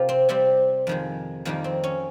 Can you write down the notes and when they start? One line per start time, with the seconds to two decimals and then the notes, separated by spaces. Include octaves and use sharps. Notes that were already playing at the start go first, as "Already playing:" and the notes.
Already playing: C3 F4 G4 A#4 C5
0.09 C4
0.29 C3 G3 C4
0.87 F2 D#3 G#3
1.45 F2 D#3 G3 A#3
1.64 C4
1.84 C#4